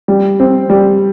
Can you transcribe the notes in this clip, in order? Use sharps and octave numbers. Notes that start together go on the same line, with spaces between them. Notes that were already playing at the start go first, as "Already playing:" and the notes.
G3
C4
G3